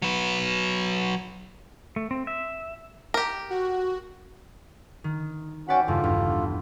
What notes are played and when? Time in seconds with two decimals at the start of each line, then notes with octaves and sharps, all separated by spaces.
0.02 F#3 B4
1.96 A3
2.11 C4
2.27 E5
3.14 G4 A#4
3.50 F#4
5.04 D#3
5.68 C#4 F#4 B4 D5 F#5 G5
5.88 E2 G2 C#3 F4 A4
6.04 A1 E2 G2